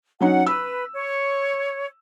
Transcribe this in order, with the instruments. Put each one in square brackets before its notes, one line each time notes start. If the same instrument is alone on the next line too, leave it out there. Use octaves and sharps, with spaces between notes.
[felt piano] F#3 C#4 D#4 [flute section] F#5
[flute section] B4 [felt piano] E6
[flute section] C#5